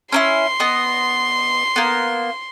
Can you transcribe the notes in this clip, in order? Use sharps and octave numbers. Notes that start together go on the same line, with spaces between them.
C#4 D4 E4 C6
B3 D#5
A#3 B3